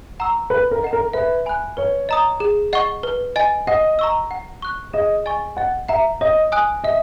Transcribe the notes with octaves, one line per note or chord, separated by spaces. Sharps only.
F#5 A#5 C#6 E6
A#4 B4
A#4
D#5 F#5 A#5
A#4
B4 E5
G#5 B5 F#6
B4 C#5
D#5 A#5 D#6
G#4
D#5 F#5 C#6
B4
D#5 G#5
D#5 F#5
A#5 C#6 E6
F#5
C#6 F#6
G#4 D#5
D#5 G#5 C#6
D#5 F#5
E5 F#5 A#5
C#5 D#5
G#5 D#6 F#6
D#5 E5